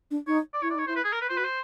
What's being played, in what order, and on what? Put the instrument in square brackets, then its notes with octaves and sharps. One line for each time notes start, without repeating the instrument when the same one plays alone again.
[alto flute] D4
[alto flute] D#4 [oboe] C#5
[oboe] D5
[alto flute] E4 [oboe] C#5
[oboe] D5
[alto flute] D#4 [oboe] C#5
[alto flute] E4 [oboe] C5
[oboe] B4
G#4
A#4
B4
[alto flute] F4 [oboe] C5
[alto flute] F#4 [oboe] B4
[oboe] C5